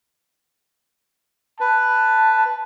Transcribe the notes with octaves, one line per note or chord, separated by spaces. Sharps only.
B4 A5